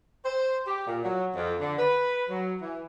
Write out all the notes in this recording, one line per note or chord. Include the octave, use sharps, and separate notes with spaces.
C5
G4
A#2
F#3
F2
D3
B4
F#3
E3